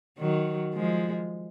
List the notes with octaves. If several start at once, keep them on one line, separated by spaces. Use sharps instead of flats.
D#3 F#3
F3 G#3